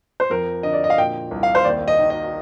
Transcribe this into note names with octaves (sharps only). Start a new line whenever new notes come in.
C5
F2 A#4
D3 D#5
D5
D#5
F5
A#2 G5
C2
F5
C5
D#2 D5
D#5
D#3
D#5